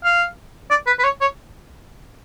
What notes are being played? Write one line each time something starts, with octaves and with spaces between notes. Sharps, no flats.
F5
D5
B4
B4
C#5
C#5